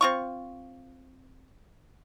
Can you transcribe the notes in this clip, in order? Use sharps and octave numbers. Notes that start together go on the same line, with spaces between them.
C4 F4 C#6